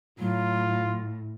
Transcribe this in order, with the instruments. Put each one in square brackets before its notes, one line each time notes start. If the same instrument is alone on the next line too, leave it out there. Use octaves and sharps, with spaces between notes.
[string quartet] A2 [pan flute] F#3 [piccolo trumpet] F4